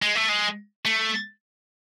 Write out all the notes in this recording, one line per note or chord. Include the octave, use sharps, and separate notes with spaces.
G#3
A3
G#3
A3